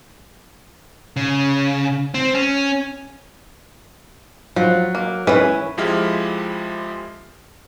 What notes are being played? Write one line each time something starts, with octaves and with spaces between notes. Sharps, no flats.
C#3
C4
C#4
F3 F#3
A#3
E3 C#4 B4
F2 F3 G#3 E4 G4 F6